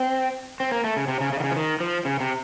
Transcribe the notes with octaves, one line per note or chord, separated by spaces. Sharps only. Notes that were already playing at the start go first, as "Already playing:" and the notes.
Already playing: C4
C4
A#3
A3
C#3
C3
C#3
C#3
D#3
C#3
F3
D#3
F3
C#3
C3